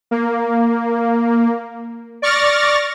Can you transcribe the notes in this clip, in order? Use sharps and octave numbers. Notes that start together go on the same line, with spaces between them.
A#3
D5 C#6 F6 A6 A#6